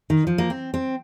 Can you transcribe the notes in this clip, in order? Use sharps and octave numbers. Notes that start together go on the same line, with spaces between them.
D#3
F3
A#3
C4
C4